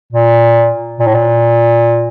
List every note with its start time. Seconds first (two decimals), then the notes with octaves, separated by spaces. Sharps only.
0.13 A#2
0.99 A#2
1.07 A2
1.14 A#2